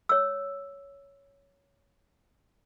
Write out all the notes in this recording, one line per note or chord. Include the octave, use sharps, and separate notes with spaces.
C#5 E6